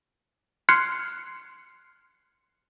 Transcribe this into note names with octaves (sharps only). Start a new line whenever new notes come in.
C6 F6 F#6 G#6 C7 C#7